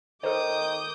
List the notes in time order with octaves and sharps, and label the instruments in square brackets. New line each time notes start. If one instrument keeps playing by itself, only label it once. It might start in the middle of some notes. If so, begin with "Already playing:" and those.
[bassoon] D#3 [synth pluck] A4 C5 [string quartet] D6 D#6 G6